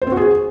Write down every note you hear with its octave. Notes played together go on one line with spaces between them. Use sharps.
C5
C4
F#4
G#4